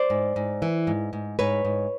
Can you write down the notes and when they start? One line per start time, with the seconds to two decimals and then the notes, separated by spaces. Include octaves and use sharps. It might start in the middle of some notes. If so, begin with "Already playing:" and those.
Already playing: C5 D5
0.10 G#2
0.36 G#2
0.62 E3
0.87 G#2
1.13 G#2
1.39 G#2 B4 C#5
1.65 G#2